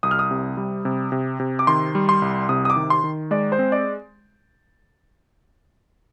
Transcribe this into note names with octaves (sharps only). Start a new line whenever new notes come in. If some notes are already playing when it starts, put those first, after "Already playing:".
C2 D#6
F6
D#6
C3
G3
C3
C3
C3
D6
D#3 C6
G3
C6
C2
C3 D#6
D#6
D6
D#3
C6
D#3
G#3 D5
C5
C4
D5